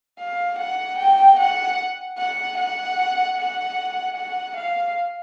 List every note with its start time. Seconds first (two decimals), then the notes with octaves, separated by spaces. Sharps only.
0.19 F5
0.59 F#5
0.99 G5
1.40 F#5
2.18 F#5
2.58 F#5
3.38 F#5
4.17 F#5
4.57 F5